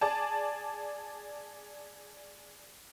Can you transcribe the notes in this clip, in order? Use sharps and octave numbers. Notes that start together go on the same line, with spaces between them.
G#4 D5 A5